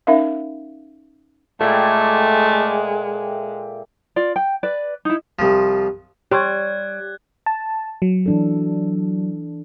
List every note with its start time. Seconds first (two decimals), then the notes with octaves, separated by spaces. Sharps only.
0.07 C#4 D#4 A#4 E5 F5
1.61 A#2 G#3 A3 A4 E5 G5
4.16 F4 D5
4.36 G5
4.63 B4 D5
5.05 D#4 E4
5.39 C2 F3
6.31 G3 G4 C#5 C6 C#6 F#6 G#6
7.46 A5
8.02 F#3
8.26 E3 D4 A4